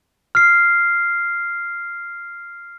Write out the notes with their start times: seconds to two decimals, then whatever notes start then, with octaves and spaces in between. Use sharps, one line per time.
0.35 F6 C7